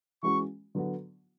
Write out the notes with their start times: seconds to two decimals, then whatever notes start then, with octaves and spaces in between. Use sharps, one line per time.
0.23 E3 G#3 C#4 F#4 C#6
0.75 D3 F#3 B3 F#4